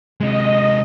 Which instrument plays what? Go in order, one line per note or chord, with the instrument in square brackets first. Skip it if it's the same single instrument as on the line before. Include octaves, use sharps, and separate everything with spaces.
[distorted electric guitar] C3 G#3 [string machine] D#5